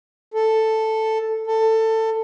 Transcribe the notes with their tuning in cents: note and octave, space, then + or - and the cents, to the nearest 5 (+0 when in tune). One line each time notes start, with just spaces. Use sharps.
A4 +5
A4 +20